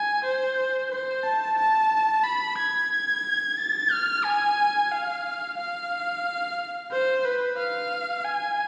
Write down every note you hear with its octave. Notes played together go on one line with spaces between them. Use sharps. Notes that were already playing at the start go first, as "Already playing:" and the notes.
Already playing: G#5
C5
C5
A5
A5
B5
G#6
A6
F6
G#5
F5
F5
C5
B4
F5
G#5